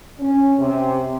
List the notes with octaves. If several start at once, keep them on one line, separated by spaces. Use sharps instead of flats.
C#4
C3